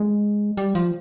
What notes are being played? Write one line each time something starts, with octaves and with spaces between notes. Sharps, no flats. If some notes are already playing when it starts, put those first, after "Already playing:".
Already playing: G#3
G3
F3